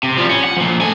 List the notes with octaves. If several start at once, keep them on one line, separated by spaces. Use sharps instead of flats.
C3
F3 G3
C#4
F#5
F3 A#3
A3 G#5